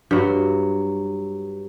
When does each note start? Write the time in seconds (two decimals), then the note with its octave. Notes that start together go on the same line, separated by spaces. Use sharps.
0.11 G2 F#3